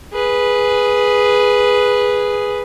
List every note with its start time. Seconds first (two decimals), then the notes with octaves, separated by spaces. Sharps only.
0.13 G#4 B4